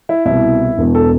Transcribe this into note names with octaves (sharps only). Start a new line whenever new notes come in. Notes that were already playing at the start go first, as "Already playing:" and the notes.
E4
C2 B2 E4
E1 E2 B2
A4